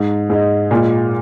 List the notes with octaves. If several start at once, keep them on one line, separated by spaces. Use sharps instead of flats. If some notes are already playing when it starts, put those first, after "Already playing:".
Already playing: G#2 G#3 D#4
G#2 G#3 D#4
A#2 G#3 F4